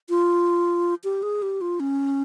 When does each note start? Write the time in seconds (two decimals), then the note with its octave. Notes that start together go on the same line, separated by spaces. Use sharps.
0.10 F4
1.04 G4
1.23 G#4
1.42 G4
1.61 F4
1.80 C#4